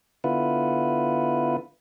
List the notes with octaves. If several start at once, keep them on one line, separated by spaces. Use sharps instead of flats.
D3 B3 E4 F4 B4